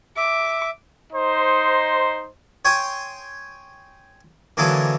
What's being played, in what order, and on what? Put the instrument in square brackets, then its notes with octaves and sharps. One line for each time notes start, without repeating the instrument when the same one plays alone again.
[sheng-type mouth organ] E5 [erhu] D6
[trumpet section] D#4 C5
[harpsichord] C#5 G5 G#5 C6 D#6
D3 E3 F#3 A#3 G#4 A4